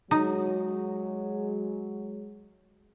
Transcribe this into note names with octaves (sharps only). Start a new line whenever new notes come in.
F#3 G#3 D#4